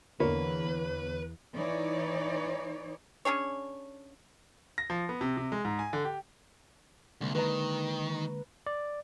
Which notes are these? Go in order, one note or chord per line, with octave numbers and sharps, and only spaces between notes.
E2 D3 A#3 B4 C#5 B5
E3 D#4 C#5 D5
C#4 D4 G#4 C#5
A#6
F3
B3
C3
C3
G#3
G#2
G#5
D3
G4
C2 D3 G#3 A#3
D#3 B4 A#5
D5